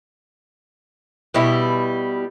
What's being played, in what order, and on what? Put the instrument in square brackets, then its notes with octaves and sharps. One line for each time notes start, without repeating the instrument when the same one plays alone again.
[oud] B2 G3 E4